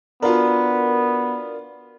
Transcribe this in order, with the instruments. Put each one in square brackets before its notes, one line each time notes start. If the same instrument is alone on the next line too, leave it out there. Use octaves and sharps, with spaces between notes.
[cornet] B3 [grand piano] D4 F4 [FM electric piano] F#4 A#4